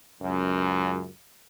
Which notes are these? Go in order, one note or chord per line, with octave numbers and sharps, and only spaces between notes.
C#2 F#2